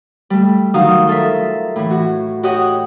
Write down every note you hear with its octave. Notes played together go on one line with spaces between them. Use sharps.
G3 A3
D#3 F#3 D#4 F#4 F5 D#6
F4 A4 A#4 E5
A2 E3
F#4
F#4 G4 C#5 D#5 F#5